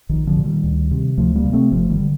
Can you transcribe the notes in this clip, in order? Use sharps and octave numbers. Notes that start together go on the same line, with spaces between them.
A#1 D#3
D3 F3
A#2
D#3 G3
D2
C3
D2 F3 A3
G3 A#3
C3
A3 C4
G1 F3 A3
D#3 G3
D3